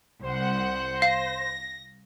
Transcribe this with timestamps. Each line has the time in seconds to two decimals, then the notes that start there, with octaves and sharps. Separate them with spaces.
0.23 C2 C5 F#5
1.02 F5 A#6